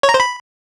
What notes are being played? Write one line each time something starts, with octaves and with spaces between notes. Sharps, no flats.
C#5
A#5
C5
B5